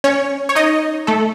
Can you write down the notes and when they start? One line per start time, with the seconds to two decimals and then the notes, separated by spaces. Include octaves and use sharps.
0.04 C#4 C#5
0.49 C#5
0.55 D#4 D#5
1.07 A3 A4